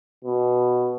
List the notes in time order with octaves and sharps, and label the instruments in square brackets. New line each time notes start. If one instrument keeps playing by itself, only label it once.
[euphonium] B2